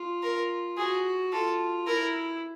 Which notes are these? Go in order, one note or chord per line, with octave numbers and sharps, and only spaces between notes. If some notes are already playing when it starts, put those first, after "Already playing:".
Already playing: F4
A#4
F#4 G#4
F4 A4
E4 A#4